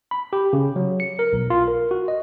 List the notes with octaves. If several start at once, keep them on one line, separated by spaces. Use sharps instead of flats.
B5
G4
C#3
F#3
C#7
A#4
B1
F4
A#4
F#4
D#5